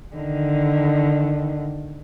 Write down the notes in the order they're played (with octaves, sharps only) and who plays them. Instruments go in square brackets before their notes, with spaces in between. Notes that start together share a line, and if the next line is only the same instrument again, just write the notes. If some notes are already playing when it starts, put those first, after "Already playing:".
[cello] D3 D#3